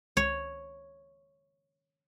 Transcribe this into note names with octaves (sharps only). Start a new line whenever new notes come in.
C#2 C#5